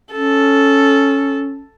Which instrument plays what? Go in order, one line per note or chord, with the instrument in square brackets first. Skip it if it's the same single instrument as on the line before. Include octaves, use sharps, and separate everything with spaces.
[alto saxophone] C#4 [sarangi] A4